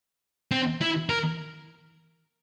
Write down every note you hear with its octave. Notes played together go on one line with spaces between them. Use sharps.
C4
E4
A#4